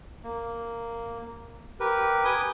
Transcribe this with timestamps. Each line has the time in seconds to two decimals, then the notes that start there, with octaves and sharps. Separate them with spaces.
0.24 A#3
1.80 G4 A#4 B4
2.25 B4 G#5 D6 D#6 G6